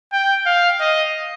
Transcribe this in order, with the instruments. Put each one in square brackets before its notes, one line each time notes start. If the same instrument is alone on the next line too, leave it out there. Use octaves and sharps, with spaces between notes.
[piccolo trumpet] G5
F5
D#5